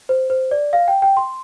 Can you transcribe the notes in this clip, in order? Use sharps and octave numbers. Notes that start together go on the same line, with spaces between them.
C5
C5
D5
F5
G5
G5
C6